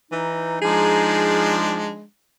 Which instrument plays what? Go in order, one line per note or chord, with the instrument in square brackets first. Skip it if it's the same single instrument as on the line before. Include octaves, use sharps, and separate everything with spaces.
[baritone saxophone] E3 [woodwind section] D#4
[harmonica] F3 G#3 D4 [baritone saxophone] G#4